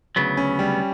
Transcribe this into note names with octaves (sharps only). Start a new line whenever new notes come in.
D2 C#3 F#3 B3
C#4
G3